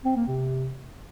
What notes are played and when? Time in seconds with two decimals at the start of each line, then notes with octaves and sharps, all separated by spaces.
0.05 C4
0.16 A#3
0.28 C3